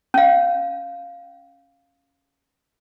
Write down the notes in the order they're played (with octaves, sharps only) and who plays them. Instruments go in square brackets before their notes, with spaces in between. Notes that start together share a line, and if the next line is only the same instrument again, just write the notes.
[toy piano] C#4 F5